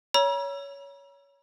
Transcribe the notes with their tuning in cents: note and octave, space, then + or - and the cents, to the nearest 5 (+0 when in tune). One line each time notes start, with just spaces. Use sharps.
C#5 +15 A#5 +45 E6 +30